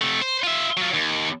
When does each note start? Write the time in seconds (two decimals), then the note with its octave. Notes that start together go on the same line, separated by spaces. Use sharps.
0.02 C3 A3
0.22 C5
0.44 F4 E5
0.77 F#3 F4
0.94 D#2